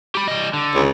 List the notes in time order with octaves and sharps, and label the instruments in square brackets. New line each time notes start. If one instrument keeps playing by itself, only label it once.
[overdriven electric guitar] G4 B5
G3 D#5
D3
[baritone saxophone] C#2